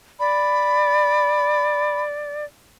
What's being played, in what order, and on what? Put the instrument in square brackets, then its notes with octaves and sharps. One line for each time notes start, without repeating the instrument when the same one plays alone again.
[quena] D5 [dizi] B5